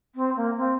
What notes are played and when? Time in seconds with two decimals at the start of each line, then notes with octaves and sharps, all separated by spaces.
0.15 C4
0.36 A#3
0.57 C4